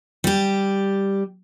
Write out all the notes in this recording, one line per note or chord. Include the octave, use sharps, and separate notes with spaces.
G3 G4